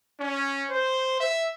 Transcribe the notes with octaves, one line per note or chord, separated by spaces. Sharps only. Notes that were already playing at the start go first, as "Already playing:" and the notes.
C#4
C5
E5